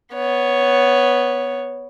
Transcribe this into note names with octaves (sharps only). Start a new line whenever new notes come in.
B3 C#5